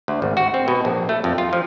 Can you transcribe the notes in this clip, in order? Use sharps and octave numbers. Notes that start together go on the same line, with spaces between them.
D2
G#1
F#4
C4
B2
A#1
A3
F2
F4
F3